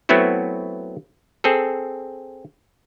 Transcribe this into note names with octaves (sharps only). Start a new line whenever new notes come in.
F#3 A3 B3 C4 E4 F#4
C4 G#4 A4